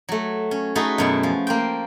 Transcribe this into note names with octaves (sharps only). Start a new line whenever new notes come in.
F#3 A3
C#4
A3 D#4 F#4 G#4 A4 B4
F#2 B2 E4
F3
A#3 C5 G5